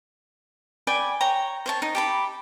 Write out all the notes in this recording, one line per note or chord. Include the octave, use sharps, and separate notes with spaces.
D5 G5 G#5 B5
C#5 G5 A#5
C5 C#5 A5
D#4
G4 A5 B5